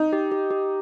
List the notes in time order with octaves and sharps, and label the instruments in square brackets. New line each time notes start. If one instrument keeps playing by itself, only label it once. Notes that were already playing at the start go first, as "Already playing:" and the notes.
Already playing: [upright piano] D#4
[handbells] G4
G4
G4